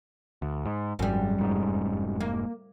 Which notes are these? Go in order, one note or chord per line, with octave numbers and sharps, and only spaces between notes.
D2
G#2
G#1 F#2 G3
F1 G#2
A#3